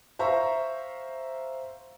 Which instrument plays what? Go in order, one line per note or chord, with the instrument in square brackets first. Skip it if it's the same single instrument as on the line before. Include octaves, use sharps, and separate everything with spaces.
[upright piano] C5 E5 F5 A#5 C#6